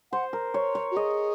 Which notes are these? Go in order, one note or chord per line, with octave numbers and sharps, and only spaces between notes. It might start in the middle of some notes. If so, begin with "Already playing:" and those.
C5 F#5
A#4
C#5
C#5
F#4
G#4 D#5